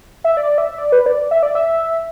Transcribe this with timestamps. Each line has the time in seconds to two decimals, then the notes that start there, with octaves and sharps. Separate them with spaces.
0.24 E5
0.37 D5
0.58 E5
0.78 D5
0.92 B4
1.06 D5
1.31 E5
1.43 D5
1.55 E5